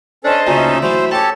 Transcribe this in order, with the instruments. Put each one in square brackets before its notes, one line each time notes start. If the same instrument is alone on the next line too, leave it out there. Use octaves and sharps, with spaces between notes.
[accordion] C#4 A4 [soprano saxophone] D4 [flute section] C5 D#5 A5
[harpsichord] D2 A#2 C#3 [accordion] C#4 D#4 [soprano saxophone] E5
[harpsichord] E3 F#3 A3 [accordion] C5
[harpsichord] C#4 D6 [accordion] G4 A4 [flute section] C#5 [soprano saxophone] A5